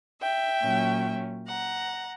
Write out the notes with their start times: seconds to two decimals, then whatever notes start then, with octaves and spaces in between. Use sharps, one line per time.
0.21 E5 G5
0.63 A#2 F#3 C#4
1.47 F#5 A#5